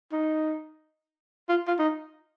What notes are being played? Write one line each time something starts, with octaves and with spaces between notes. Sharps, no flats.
D#4
F4
F4
D#4